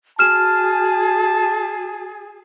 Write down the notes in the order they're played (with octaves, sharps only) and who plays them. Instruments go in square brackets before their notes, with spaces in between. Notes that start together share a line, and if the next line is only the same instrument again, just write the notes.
[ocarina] F#4 [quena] G#4 [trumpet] A5 [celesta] F6 E7